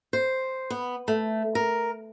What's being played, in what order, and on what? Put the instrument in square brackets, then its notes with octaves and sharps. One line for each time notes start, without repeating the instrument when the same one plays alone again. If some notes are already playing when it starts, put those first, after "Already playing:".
[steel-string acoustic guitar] C5
B3
A3
A#4